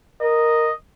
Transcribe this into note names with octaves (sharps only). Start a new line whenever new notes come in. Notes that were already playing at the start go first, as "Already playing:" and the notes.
A#4 D#5